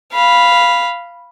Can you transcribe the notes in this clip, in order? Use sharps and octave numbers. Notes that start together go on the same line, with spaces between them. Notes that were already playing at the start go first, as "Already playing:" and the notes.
F5 B5